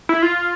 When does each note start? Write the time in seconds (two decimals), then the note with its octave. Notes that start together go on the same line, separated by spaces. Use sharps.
0.09 E4
0.22 F4